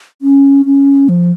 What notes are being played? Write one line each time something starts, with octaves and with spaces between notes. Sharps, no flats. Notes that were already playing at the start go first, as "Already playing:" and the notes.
C#4
C#4
F3